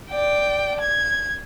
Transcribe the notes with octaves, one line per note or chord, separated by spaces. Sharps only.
D5 G5
G#6